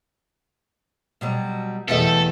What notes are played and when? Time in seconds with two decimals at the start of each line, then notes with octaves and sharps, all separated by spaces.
1.21 B2 F#3 G3
1.88 E2 B2 G3 A3 A4 E5